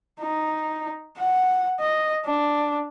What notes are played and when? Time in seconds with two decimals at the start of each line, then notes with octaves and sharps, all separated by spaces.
0.20 D#4
1.18 F#5
1.80 D#5
2.25 D4